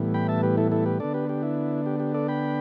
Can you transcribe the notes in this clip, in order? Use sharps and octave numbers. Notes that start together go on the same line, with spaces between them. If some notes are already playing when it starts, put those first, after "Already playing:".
Already playing: A2 E3 G3 B3
G5 B5
E5 A5
G4 B4
E4 A4
E4 A4
G4 B4
D3 B3 D4 A4 D5
G4 B4
G4
E4
G4
G4
A4 D5
G5 B5